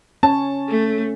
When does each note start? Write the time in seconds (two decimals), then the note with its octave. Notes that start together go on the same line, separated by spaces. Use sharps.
0.23 C#4 C#5 A5
0.69 A3